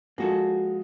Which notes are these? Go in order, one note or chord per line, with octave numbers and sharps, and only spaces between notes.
F3 G#3 A#3 F#4 A4